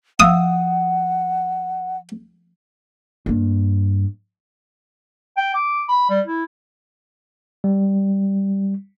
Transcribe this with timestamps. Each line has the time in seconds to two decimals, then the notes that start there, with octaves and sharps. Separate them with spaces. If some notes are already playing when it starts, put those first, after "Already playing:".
0.20 F3 F5 F#5 D#6 E6
3.26 G2 A#3
5.37 G5
5.54 D6
5.89 B5
6.10 G3
6.26 E4
7.64 G3